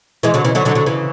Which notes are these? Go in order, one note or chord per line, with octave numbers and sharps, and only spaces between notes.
E3 G#3
D3 F#3
C#3 E3
D3 F#3
D3 F#3
D3 F#3
C#3 E3